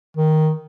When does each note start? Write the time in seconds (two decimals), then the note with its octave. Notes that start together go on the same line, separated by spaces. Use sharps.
0.17 D#3